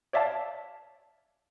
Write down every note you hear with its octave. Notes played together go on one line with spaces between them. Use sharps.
C#5 D5 E5 F5 A5